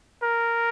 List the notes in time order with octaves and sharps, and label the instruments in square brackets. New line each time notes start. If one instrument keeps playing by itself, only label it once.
[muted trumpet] A#4